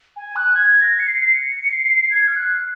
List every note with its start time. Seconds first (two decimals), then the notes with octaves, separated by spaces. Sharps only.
0.16 G#5
0.36 F#6
0.55 G#6
0.81 A#6
0.99 C#7
1.07 C7
1.33 C#7
1.72 C7
2.10 G#6
2.27 F6
2.36 F#6